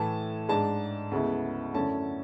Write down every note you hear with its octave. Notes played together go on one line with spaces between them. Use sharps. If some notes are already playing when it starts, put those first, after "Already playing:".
Already playing: A2 E3 A3 A5
G#2 G#3 D4 A5
D2 C#3 G#3 B3 E4
F#2 D3 A3 C#4 E4 A5